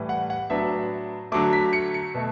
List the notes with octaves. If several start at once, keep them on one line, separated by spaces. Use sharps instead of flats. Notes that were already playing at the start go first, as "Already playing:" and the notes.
Already playing: A2 E3 G3
F#5
F#5
A2 F#3 B3 D4 E5
D3 F#3 A3 D6
B6
C#7
C#7
B2 A3